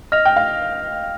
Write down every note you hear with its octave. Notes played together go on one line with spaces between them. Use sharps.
D#5 F6 A#6 F7
G5
F5